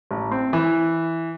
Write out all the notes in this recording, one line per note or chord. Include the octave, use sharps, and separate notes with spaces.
A1
C4
E3